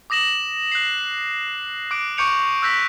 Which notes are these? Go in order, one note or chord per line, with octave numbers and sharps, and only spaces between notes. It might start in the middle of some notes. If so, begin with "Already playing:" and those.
D6 D#6 A#6 E7 F#7
F#6 C7
D6 F#6 D7
C#6 D6 G6 C#7 D7 F7
E6 F#6 G6 A#6 B6